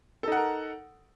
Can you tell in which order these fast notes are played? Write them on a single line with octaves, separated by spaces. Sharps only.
A4 D#4 F#5 A#4